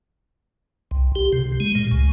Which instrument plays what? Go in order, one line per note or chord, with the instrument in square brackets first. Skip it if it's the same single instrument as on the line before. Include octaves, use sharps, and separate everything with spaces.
[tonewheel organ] C2
G4
C3
G#3
A#2
C#2